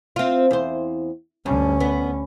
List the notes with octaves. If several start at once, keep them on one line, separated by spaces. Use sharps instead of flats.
C4 F4
E2 C5
D2 G2 C#4
B3